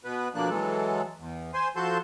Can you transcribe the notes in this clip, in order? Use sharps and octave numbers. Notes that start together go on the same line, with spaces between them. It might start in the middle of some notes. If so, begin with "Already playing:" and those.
B2 B3 B4
B2 D3 F3 A#3 D4 F#6
E3 F#3 G#3 A4
E2
C5 G#5 C6
F3 F#4 A4 A5 C6 G6